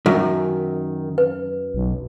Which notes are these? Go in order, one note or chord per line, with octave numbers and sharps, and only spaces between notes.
F#2 D#3
B4
B1